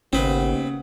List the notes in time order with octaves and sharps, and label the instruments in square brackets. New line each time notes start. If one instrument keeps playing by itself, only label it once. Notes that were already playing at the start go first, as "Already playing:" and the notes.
[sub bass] G#1 [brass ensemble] D#2 B3 [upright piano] C#3 [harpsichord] C4 B4